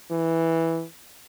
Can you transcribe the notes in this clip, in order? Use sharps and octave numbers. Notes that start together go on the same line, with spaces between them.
E3